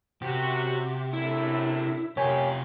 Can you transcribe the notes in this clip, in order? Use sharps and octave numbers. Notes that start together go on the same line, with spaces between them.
F#2 C3 F#4 G4
F#2 A2 D4 E4
F#2 C3 F4 G4 C#5 G#5